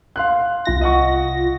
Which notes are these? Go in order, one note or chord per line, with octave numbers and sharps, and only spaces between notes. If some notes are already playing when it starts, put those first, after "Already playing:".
F5 C6 F#6
C2 F4 A#6
D#5 F#5 C#6